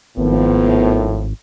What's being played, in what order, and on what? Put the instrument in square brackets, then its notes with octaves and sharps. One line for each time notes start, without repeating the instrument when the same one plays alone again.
[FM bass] G#1 [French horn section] A2 D#3 F3 [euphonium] B3